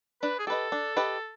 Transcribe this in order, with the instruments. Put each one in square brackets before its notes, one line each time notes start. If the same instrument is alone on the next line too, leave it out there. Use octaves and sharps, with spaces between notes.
[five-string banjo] D4 [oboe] B4
[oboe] G#4
[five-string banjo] G4 B4 D#5 [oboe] A4
[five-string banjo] D4
G4 B4 D#5